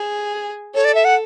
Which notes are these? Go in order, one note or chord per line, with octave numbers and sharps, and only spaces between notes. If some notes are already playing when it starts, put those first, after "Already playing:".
Already playing: G#4
A4 C#5
D5
E5
F#5